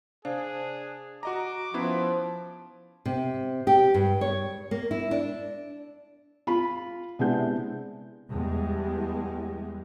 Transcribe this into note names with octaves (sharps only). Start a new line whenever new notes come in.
C3 D4 G#4 C5 F5
F#4 D#5 A#5 D6
F3 B3 C#4 E4 B4 C5
C3
G4
G2
C#5
A#3
E4
D4
F4 B5
C3 G#3 B3 D4 E4 G6
E2 G3 G#3